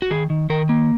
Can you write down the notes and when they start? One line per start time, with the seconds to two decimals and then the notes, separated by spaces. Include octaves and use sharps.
0.02 F#4
0.10 D#3 G#4
0.30 D#3
0.50 D#3 A#4
0.69 A#3